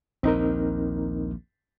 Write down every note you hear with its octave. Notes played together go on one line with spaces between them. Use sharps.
A#1 D#2 C4 D#4 A#4